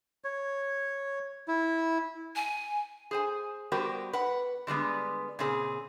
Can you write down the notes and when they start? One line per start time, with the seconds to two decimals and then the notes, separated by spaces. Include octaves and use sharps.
0.24 C#5
1.48 E4
2.36 G#5
3.11 G#4 C5 G#5
3.72 G3 B3 F#4 G4 A#4 C5
4.13 B4 F#5
4.67 D3 G3 G#3 B3
5.39 A#2 C#3 C4 G#4